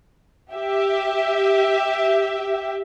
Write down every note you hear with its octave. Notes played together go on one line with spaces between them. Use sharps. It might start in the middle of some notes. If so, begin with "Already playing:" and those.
G4 E5